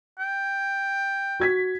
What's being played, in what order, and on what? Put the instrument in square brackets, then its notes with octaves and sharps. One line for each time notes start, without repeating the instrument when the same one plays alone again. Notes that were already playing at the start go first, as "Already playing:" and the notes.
[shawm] G5
[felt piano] F#4 G#6 B6